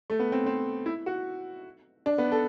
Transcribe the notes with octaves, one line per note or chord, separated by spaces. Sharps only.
A3
B3
C4
C4
E4
F#4
D4
B3
A4